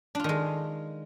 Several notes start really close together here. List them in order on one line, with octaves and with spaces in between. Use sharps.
D4 F4 D#3 G#3